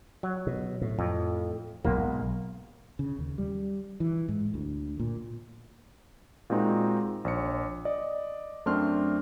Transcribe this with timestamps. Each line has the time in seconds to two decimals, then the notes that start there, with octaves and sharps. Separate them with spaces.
0.23 F#3
0.47 B2
0.82 A2
0.99 F2
1.85 B1 G#2 B2 A#3
2.99 C#3
3.19 D#2
3.38 G3
4.00 E3
4.29 G#2
4.54 D2
5.00 A#2
6.50 A#2 G#3 C4 D#4 F#4 G#4
7.25 A#1 C#5 C#7
7.85 D5 D#5
8.66 F#2 A3 C4 D4 C6 F6